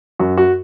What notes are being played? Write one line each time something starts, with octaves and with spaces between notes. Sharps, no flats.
F#2 F#4
F#4